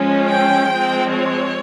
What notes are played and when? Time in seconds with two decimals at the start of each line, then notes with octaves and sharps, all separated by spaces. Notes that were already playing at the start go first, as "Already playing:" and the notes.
Already playing: F3 G#3 C#4
0.27 G5
0.69 F3 G#3 C4
1.11 C#5